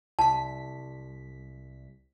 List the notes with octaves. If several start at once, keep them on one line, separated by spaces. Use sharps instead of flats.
C2 A5 B6